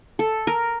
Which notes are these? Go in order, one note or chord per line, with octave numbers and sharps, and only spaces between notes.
A4
A#4